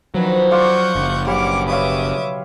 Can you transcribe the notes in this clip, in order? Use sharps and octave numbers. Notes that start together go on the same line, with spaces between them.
D#3 F3 F#3 C#4 D4 B4 C5
D5 F5 F#5 C6 C#6 G6
F#1
B1 C#3 G3 D4 C#5 F#5 B5 D6
B4 C#5 E5 F5 D6 D#6